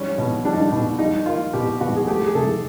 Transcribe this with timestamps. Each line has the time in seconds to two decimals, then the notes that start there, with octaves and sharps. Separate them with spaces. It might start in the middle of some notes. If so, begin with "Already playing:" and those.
Already playing: G#2 G3 C#4
0.18 B2
0.45 G3 D4
0.52 D#4
0.61 D4
0.72 B2
0.98 G3 D#4
1.26 A#3 F4
1.53 B2 G4
1.80 B2 F#4
1.96 G#4
2.07 A3 G4
2.26 G#4
2.35 C3 A4